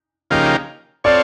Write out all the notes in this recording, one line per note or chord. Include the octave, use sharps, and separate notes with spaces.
C#3 F3 A#3 D#4 G4
C4 F4 A4 C#5 D5